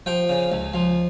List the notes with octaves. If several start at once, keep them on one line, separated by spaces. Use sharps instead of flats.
F3 G5
C#3
C#2
F3